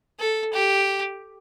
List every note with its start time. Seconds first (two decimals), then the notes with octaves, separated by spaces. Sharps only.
0.19 A4
0.53 G4